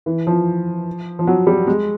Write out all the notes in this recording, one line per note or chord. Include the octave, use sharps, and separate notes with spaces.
E3
F3
F3
F#3
G3
G#3